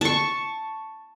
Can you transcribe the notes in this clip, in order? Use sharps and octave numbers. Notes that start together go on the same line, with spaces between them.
A5 C#6